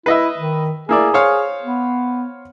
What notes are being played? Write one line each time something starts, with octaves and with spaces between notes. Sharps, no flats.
E4 B4 D#5 E5
D#3
A#3 E4 G#4 D5
C5 C#5 F5
B3